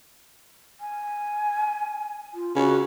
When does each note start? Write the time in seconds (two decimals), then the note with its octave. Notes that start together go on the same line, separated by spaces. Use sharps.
0.81 G#5
2.34 F4
2.56 C#3 F#4